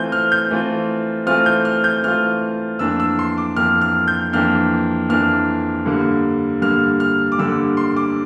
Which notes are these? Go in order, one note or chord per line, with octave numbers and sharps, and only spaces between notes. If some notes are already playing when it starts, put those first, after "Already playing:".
Already playing: E3 A3 C4 F4 G6
F6
G6
E3 A3 C4 F4
E3 A3 C4 F4 F6
G6
F6
G6
E3 A3 C4 F4 F6
F2 E3 A#3 D4 E6
E6
C6
D6
F2 E3 A#3 D4 F6
F6
G6
F2 E3 A#3 D4 F6
F2 E3 A#3 D4 F6
G2 D3 G3 A#3
G2 D3 G3 A#3 F6
F6
D6
G2 D3 G3 A#3 E6
C6
D6